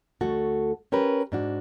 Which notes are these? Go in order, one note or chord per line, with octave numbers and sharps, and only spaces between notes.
D2 A3 F#4 A4
C#4 G4 A#4 B4
G#2 D4 F#4